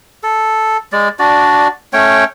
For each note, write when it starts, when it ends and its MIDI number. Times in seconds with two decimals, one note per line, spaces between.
0.23 0.77 69
0.92 1.09 56
0.92 1.09 74
1.19 1.68 62
1.19 1.68 66
1.19 1.68 74
1.93 2.24 57
1.93 2.24 61
1.93 2.24 73
1.93 2.24 79